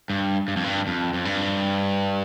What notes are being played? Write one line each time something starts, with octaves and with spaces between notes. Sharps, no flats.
G2
G2
F2
G2
F2
F2
G2